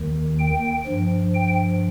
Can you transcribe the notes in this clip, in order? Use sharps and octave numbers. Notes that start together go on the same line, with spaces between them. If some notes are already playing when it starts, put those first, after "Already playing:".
Already playing: D#2 D#3
G5
G2 F3
G5